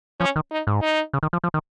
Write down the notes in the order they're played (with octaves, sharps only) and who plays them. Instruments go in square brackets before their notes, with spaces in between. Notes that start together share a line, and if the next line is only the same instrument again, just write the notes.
[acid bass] F3 [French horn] C#4
[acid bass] D#3
[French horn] D#4
[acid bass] G#2
[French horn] D#4
[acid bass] C#3
D#3
F3
F3
D#3